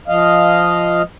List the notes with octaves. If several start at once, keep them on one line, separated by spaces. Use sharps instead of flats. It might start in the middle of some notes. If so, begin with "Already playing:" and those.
F3 D#5 F5